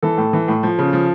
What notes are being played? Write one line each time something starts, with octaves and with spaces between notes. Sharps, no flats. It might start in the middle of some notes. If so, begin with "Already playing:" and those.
E3 A4
A2
E3
A2
F3
C#3
F3